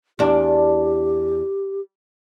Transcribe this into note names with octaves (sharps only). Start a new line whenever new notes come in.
E2 D4 G4